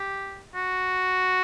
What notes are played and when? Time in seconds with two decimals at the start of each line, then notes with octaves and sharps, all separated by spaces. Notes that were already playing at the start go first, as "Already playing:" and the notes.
Already playing: G4
0.55 F#4